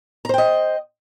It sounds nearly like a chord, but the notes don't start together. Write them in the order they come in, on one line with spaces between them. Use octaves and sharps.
A#5 C5 G5 D#5